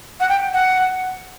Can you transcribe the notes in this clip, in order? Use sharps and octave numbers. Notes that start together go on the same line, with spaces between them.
F#5
G5
F#5